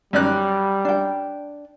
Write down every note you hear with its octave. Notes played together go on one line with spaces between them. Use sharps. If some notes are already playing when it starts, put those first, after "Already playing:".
F#2 G3 D5 F#6
D4 G5